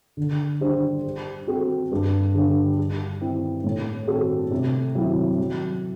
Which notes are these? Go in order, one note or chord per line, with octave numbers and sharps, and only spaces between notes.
D3
G3 D4 G4 C5
G3
C4 F#4 A4
G2
D3 G3 D4 G4
G3
C4 E4
A2
G3 C4 F#4 A4
C3
F#3 C4 E4
F#3